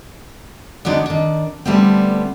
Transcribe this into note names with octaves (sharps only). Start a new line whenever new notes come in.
D3 F#3 B3 D4 D#4
D#3 D4
D3 G3 A3 B3 C4